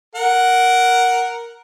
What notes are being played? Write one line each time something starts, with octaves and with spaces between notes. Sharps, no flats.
A#4 F#5